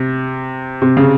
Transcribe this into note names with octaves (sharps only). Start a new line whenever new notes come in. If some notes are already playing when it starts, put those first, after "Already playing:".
Already playing: C3
C3
C#3